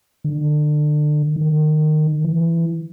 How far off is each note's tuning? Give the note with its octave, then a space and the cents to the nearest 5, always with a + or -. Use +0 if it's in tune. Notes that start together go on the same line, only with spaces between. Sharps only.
D3 +30
D#3 -20
E3 +15